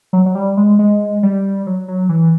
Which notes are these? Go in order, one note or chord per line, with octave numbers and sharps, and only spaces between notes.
F#3
F#3
G3
G#3
G#3
G3
F#3
F#3
E3